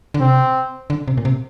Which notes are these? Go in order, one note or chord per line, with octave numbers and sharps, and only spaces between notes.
D3
C3 C4
D3
C3
A#2
C3